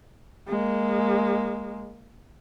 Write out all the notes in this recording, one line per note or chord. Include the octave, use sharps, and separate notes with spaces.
G#3 A#3